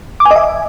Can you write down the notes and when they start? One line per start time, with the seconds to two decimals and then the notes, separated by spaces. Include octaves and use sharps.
0.20 D6
0.25 G#5
0.31 D#5
0.36 E5